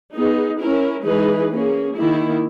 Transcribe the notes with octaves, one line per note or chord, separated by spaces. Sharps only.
B3 D#4 G#4
C#4 E4 A#4
E3 G#3 D#4 G#4 B4
A#3 C#4 G#4
D#3 A#3 E4